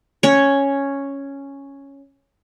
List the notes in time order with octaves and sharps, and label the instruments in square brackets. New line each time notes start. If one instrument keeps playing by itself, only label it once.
[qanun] C#4 C#5